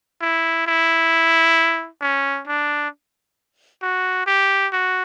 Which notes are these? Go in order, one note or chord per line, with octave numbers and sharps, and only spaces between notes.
E4
E4
C#4
D4
F#4
G4
F#4